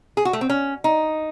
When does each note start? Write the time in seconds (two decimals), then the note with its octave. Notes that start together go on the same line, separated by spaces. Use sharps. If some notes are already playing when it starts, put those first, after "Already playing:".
0.17 G#4
0.25 F#4
0.33 A3
0.41 C4
0.50 C#4
0.84 D#4